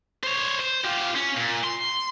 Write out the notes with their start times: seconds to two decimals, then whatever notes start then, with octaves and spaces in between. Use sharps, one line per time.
0.23 C5 C#5
0.60 C5
0.84 F4 G4
1.15 C#4
1.37 A#2
1.64 C6